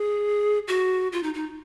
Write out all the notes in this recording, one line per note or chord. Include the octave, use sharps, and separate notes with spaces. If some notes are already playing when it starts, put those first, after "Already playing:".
Already playing: G#4
F#4
F4
D#4
D#4